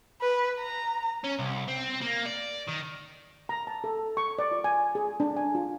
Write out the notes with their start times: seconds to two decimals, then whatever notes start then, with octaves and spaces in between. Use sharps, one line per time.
0.21 B4
0.60 A#5
1.24 C#4
1.39 C2
1.68 C4
2.01 A#3
2.26 D5
2.68 D#3
3.49 A#5
3.67 A5
3.84 A4
4.17 C#6
4.39 D5
4.51 F4
4.64 G#5
4.95 G#4
5.20 D4
5.37 G#5
5.55 F4